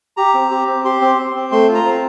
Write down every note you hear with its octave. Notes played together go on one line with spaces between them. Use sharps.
G4 A#5
C4
G4
C4
G4 C6
C4
C4
C4
A3 C6
F4
A#5
C4